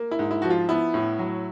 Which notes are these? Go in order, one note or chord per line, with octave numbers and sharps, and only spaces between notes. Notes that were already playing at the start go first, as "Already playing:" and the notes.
Already playing: A#3
E4
G#2
E4
F3 F#4
F4
B3 E4
A2
F#3